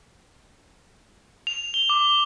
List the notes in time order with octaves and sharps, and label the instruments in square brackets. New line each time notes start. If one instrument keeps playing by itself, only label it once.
[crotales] F7
G7
D6